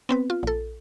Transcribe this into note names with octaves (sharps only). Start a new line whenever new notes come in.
B3 C4 B4
F4
A#1 A4